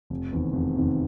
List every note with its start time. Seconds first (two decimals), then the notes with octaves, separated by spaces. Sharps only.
0.10 F1
0.32 E2 C3 D#3
0.53 F1
0.75 E2 C3 D#3